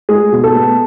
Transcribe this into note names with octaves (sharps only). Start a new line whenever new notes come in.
G#3 G#4
B2
A4
B3